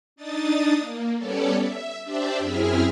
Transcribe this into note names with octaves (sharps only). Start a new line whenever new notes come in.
D4 D#4 D#6 A6
A#3
G3 B3 C#4 A4 C#5 D5
E5
D4 G4 C5 D5 E5
F#2 C4 E4 G#4 E5 F6